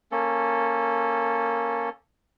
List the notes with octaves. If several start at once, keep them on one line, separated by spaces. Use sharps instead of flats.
A#3 C#4 A4